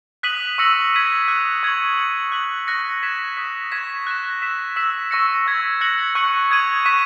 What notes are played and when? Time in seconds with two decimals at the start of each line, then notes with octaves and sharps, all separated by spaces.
0.23 D#6 F#6 B6 D#7 F#7
0.58 C#6 E6 A#6 C#7 F#7
0.93 G#6 B6 D#7 F#7
1.28 D#6 F#6 C#7
1.63 C#6 G#6 C#7 F#7
1.98 G#6 C#7 F#7
2.32 F#6 B6 F#7
2.67 C#6 F#6 A#6 C#7
3.03 G#6 B6 E7
3.37 D#6 F#6 B6
3.72 C#6 G#6 B6 E7
4.07 F#6 A#6 E7
4.41 E6 B6 E7
4.76 E6 B6 E7
5.11 C#6 E6 A#6 C#7
5.46 C#6 E6 G#6 B6
5.81 F#6 A#6 C#7 F#7
6.15 C#6 F#6 C#7 F#7
6.50 D#6 G#6 D#7 F#7
6.85 C#6 F#6 B6 E7